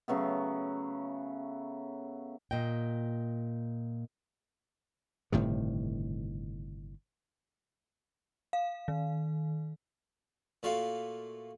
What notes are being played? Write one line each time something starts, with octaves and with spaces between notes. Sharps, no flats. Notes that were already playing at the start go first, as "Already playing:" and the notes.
C#3 F#3 A3 B3
A#2 D#5 G5
G1 A2 C3 D#3
F5
D#3
A#2 A3 F4 F#4 F5